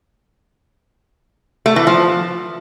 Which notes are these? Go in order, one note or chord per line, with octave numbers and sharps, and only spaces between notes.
A3
E3
F3